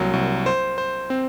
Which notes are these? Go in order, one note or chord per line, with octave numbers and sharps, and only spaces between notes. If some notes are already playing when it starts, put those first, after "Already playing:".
Already playing: C2 F#3 A#3
C2
C5
C5
C4